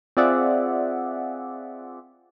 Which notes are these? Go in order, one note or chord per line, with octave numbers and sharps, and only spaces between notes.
C4 F4 G#4 D5 E5 F#5